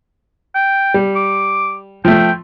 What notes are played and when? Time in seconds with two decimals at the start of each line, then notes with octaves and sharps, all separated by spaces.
0.55 G5
0.94 G3
1.16 D6
2.05 F3 A3 G5